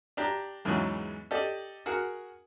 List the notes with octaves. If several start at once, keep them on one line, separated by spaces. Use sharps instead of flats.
D4 G4 A#5
E2 G#2 C#3 E3 F#3
G4 A4 D5 D#5
F#4 G#4 A#4 F#5